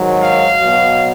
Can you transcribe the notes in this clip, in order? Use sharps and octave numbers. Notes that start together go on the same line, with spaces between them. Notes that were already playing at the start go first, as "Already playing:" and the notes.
Already playing: G#2 D#3 F#3
F5
B2 F#3